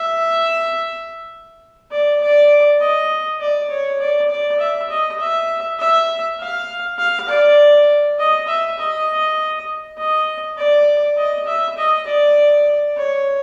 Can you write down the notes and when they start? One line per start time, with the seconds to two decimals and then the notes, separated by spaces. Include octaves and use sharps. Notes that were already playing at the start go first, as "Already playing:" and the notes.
Already playing: E5
1.91 D5
2.20 D5
2.80 D#5
3.40 D5
3.70 C#5
3.99 D5
4.30 D5
4.60 E5
4.89 D#5
5.20 E5
5.79 E5
6.39 F5
6.98 F5
7.29 D5
8.19 D#5
8.48 E5
8.78 D#5
9.97 D#5
10.57 D5
11.17 D#5
11.47 E5
11.77 D#5
12.07 D5
12.96 C#5